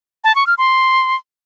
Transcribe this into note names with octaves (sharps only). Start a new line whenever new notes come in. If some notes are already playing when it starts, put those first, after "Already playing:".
A5
C#6
F6
C6